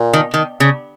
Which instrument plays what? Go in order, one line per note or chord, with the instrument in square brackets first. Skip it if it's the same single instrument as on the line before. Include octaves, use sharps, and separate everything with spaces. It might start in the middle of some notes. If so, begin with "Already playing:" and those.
Already playing: [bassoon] A#2
[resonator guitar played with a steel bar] D#3
D#3
C#3